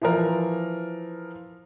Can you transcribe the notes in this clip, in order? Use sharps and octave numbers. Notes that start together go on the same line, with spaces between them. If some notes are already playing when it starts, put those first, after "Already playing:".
E3 F3 A#4